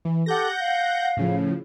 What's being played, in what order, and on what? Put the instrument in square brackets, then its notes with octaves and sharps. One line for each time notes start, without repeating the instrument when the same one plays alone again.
[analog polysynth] E3
[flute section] G4 A4 D6 [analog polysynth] F#5 G6 A#6
[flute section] F5
[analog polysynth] A2 C#3 F3